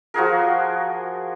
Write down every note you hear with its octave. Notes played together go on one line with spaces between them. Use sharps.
F3 F#4 G#4 A#4